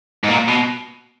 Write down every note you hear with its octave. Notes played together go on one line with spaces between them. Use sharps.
G#2
A#2
B2